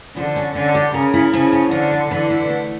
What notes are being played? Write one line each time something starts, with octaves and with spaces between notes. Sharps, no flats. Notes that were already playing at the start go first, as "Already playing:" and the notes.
D3 F3
C#4
D3 C#4
G4
C#3 A#4
E4
C#3 F3
C#4
D3 F3
D4
D3 E3
E4
A3